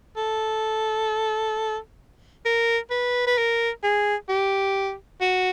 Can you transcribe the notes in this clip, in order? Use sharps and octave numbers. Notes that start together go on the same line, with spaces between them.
A4
A#4
B4
B4
A#4
G#4
G4
F#4